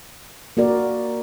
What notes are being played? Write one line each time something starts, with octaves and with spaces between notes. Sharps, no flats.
A#3 F#4 A#4 D5